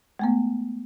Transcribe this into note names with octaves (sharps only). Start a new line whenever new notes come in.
G#3 A3 B3